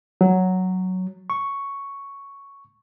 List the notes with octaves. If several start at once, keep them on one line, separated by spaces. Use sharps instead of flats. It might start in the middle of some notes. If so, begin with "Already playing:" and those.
F#3
C#6